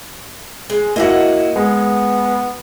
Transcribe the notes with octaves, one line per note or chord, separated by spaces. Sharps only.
G#3
A#3 E4 F#4 D#5 E5 F#5
G#3 B3